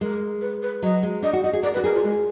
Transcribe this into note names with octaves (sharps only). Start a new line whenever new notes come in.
G#3 A#4
B4
B4
F#3 D#5
G#3
D4 D#5
F#4
F#4 D#5
G#4
A#4 D5
B4
F#4
G#4 A#4
F4
G#3